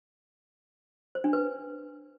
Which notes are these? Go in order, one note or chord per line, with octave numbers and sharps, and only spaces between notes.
C5
D4
B4